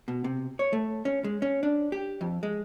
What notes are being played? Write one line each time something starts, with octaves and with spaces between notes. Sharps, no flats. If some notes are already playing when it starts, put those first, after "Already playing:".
B2
C3
C#5
A3
C#4
G#3
C#4
D4
G4
F2
G#3